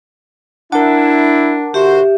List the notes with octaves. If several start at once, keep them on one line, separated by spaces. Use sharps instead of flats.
D4 E4 A#4 F#5 A5
D3 F#4 G4 C5 E5